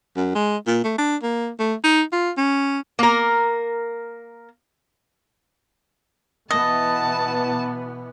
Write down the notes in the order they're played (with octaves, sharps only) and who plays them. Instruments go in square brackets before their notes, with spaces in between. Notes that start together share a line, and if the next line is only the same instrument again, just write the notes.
[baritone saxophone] F#2
G#3
A#2
A3
D4
A#3
A3
D#4
F4
C#4
[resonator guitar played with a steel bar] A#3 A#4
[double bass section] B2 E3 B3 [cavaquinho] D#5 [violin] A5